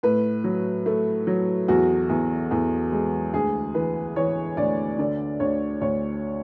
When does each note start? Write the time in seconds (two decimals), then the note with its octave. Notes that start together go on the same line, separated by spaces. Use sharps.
0.03 A2 B4
0.44 F#3
0.86 A3
1.27 F#3
1.68 E2 F#4
2.09 E2
2.51 E2
2.92 G#3
3.33 D2 G#4
3.75 E3 B4
4.16 E3 C#5
4.57 D2 D5
4.99 D3 D5
5.40 D2 C#5
5.81 D2 C#5